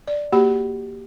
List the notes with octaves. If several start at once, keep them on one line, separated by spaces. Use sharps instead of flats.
D5
A#3 F#4 G4 B5